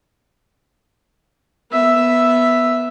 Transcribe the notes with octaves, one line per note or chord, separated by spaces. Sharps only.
B3 E5